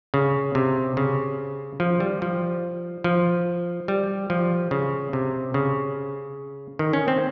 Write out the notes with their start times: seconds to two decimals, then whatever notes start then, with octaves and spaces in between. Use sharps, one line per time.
0.14 C#3
0.55 C3
0.97 C#3
1.80 F3
2.00 G3
2.22 F3
3.04 F3
3.88 G3
4.30 F3
4.71 C#3
5.13 C3
5.54 C#3
6.79 D#3
6.93 C#4
7.08 C4